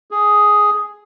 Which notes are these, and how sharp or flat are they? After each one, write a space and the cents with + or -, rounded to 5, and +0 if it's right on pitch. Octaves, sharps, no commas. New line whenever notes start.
G#4 +5